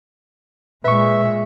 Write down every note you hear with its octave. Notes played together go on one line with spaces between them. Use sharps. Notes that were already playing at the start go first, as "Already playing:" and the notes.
A#2 G#3 B4 E5 C#6